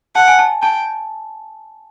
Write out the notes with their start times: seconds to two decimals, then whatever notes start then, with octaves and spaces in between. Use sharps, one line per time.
0.15 F#5 A5
0.28 G#5
0.39 A5
0.62 G5 A5